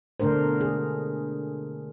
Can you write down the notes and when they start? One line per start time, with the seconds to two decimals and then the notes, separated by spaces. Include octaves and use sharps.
0.20 B2 D3 A3 D4 A#4 C5
0.61 G#4